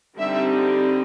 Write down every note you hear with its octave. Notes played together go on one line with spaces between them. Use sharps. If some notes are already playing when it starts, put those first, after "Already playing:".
D3 G3 C4 D#4 E5